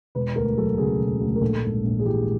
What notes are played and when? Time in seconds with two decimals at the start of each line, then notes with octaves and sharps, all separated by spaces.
0.15 E1 B4
0.36 D2 A#4
0.57 F#3 A4
0.78 C#3 G#4
0.99 E1
1.21 D2
1.36 A#4
1.41 A#1 A4
1.62 G#2
1.84 A#1
1.99 G#4
2.05 E3 G4